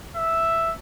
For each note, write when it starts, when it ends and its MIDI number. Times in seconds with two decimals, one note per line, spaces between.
0.16 0.73 76